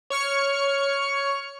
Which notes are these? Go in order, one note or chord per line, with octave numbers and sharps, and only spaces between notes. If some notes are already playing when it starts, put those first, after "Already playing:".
C#5 C#6 F6 C#7